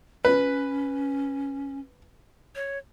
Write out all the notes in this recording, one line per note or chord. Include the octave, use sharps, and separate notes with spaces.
C#4 B4
C#5